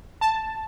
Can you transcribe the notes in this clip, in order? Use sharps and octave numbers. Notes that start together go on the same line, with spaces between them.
A5